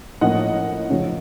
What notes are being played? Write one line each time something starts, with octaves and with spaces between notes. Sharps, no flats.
A2 F3 A#3 C#4 D#5 F#5
F#2 C#3 F3